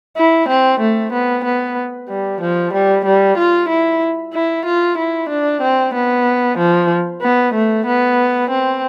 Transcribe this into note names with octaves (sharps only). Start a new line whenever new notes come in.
E4
C4
A3
B3
B3
G3
F3
G3
G3
F4
E4
E4
F4
E4
D4
C4
B3
F3
B3
A3
B3
C4